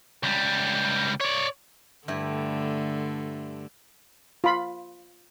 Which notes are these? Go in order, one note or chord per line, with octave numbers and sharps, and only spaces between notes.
C#2 G3
C#5 D5
G2 D3 A3 E4
F4 B5